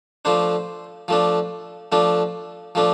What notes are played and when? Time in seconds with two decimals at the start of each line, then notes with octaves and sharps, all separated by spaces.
0.25 F3 A3 D4 C5
1.08 F3 A3 D4
1.92 F3 A3 D4
2.75 F3 A3 D4